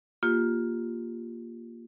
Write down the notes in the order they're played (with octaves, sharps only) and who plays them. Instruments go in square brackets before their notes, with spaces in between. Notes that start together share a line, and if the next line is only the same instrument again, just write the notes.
[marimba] A#3 F4 G4